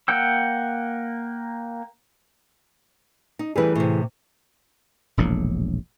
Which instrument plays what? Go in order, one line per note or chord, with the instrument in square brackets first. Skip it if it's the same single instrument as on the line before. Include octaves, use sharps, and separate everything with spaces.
[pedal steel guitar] A#3 F#5 G5 E6
[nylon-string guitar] D#4
[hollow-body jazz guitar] E3 A3 G#4 [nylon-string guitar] G3 B4
[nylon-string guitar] A2 C3
[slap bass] E1 A#1 A2